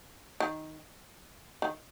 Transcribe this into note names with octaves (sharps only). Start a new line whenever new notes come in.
D#3
D#3